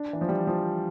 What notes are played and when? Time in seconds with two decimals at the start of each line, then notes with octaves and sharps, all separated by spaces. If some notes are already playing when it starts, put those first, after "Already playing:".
Already playing: D4
0.13 E3
0.21 F3
0.29 G3
0.47 F3